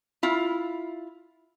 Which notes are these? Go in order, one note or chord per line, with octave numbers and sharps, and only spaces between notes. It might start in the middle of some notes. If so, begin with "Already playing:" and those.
E4 F4